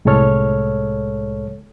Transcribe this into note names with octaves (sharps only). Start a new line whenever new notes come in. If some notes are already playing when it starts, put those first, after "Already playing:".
C2 A2 G#3 A4 C#5 F6